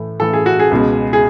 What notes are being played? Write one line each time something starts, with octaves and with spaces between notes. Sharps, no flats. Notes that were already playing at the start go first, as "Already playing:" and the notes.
Already playing: A2 E3 A3
A2 E3 A3 A4
G#4
F#4
G#4
C#2 B2 G#3
G#4